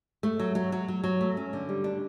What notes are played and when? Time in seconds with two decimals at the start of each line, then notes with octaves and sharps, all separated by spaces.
0.23 A3
0.40 F#3
0.55 F#3
0.72 F#3
0.88 F#3
1.04 F#3
1.21 A3
1.37 C#4
1.53 D3
1.69 G3
1.84 D4